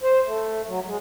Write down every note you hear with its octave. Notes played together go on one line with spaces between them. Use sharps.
C5
A3
F#3
G#3